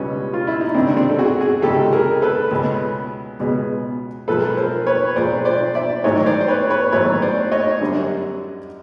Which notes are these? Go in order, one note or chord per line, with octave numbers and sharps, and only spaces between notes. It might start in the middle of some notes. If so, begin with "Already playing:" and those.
Already playing: C#2 B2 G3 B3 C#4
F4
E4
D#4
C#2 C3 D#3 C4 D4
C4 D4
A4
F#4 G#4
F#4 G#4
C#2 C3 D#3 G4 A4
G#4 A#4
A4 B4
C#2 B2 G#3 B3
C#2 B2 G#3 B3
B1 A#2 F3 G#3 A4 B4
A#4 C5
B4 C#5
B1 A#2 F3 G#3 C5 D5
C5 D5
D5 E5
A1 G#2 D#3 F#3 A3 C#5 D#5
C5 D5
C5
B4 C#5
B4 C#5
A1 G#2 D#3 F#3 A3 B4 C#5
C5 D5
C#5 D#5
F#2 D3 G3